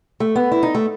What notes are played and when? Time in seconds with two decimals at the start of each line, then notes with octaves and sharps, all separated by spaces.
0.20 A3
0.36 B3
0.52 E4
0.63 D#4
0.75 A3